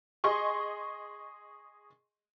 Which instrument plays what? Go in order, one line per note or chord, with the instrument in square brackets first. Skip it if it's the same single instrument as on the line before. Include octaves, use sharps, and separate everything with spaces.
[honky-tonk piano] G#4 D#5 C6 C#6